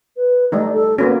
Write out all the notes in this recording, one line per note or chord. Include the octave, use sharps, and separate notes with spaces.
B4
G3 A3 D#4 D5
A4
A#3 B3 C#4 F#4